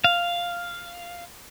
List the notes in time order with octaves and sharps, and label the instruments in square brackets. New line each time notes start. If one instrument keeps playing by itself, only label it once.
[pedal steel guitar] F5